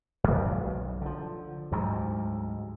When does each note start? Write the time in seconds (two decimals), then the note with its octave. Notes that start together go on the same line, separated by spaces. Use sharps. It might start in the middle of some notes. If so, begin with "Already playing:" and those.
0.24 F#2 F3 G3
0.51 B1
1.02 D3 F3
1.72 D2 G#2 F#3 G3